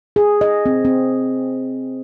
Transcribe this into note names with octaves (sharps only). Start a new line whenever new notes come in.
G#4
D#5
C4
C4